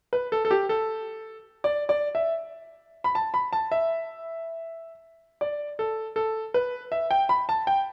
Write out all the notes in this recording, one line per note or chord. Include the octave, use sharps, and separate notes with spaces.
B4
A4
A4
G4
A4
D5
D5
E5
B5
A5
B5
A5
E5
D5
A4
A4
B4
E5
G5
B5
A5
G5